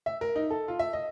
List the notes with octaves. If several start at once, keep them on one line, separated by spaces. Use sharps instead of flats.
E5
A#4
D#4
A4
F4
E5
D#5